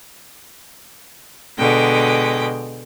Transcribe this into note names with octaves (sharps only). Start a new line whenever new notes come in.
B2 D3 G#3 G5